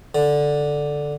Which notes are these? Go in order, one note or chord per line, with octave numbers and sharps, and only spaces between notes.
D3